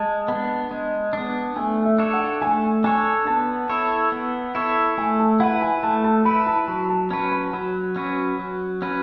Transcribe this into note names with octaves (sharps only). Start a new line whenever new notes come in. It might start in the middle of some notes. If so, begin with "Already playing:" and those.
Already playing: G#3 A5
B3 D4
G#3
B3 D4
A3 G#5
E5
D4 A4 C#5
F#5
A3 G#5
D4 A4 C#5 G#5
B3 A5
E4 A4 C#5
B3
E4 A4 C#5
A3 G#5
A5
E4 B4 F#5
G#5
A3 A5
A5
E4 B4 B5
A5
F#3 A5
A5
C#4 F#4 B4 A5
B5
F#3 B5
C#4 F#4 B4
F#3
C#4 F#4 B4